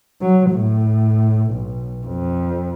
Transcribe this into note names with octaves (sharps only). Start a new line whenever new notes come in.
F#3
A2
B1
F2